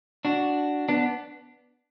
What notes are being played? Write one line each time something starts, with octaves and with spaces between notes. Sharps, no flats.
D4 F#4
B3 D4